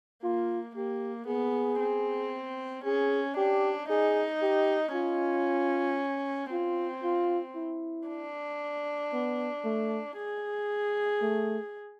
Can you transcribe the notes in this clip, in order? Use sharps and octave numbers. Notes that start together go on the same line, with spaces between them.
A#3 F4
A#3 G4
B3 G#4
C4
C#4 G#4
D4 G4
D#4 G#4
G4
C#4 F4
C4 F4
F4
E4
D4
B3
A3
G#4
A3